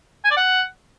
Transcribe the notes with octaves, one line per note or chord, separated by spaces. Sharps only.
G#5
D5
F#5